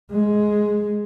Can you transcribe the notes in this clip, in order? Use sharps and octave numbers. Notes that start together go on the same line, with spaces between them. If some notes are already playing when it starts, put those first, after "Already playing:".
G#3